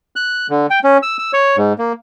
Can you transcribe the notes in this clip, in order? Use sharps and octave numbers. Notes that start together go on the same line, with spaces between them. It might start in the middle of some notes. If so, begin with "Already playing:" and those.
F#6
D3
G5
C#4
E6
E6
C#5
G#2
A#3